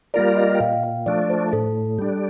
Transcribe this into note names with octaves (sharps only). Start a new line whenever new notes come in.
G3 A#3 F4 A#4 D5
D#5
G5
A#2 F5
G5
F5
F3 A3 D4 D5
C5
A2 A4
G3 D4